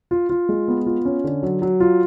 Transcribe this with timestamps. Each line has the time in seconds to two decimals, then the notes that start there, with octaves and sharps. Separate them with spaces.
0.11 F4
0.29 F4
0.49 G#3
0.68 B3
0.86 F4
1.05 C#4
1.24 D3
1.43 F#3
1.62 F#3
1.80 F4